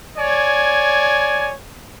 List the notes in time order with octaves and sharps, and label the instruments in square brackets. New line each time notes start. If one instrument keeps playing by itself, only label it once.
[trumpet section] C#5 D5 G#5